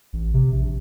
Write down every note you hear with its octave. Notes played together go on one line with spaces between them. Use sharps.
A1
C3
A#1